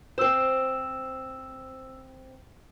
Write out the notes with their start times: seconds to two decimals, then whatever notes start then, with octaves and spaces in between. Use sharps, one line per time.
0.18 C4 C5 E6 E7